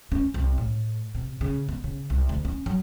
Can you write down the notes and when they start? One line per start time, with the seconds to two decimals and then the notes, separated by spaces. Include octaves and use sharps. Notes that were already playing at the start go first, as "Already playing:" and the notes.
0.12 C#4
0.34 C2
0.58 A2
1.15 C3
1.41 C#3
1.69 B3
1.84 C#3
2.10 C2
2.29 D2
2.45 C#4
2.66 F#3